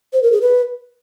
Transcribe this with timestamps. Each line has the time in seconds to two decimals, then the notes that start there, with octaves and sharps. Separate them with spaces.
0.13 C5
0.23 A#4
0.32 G#4
0.42 B4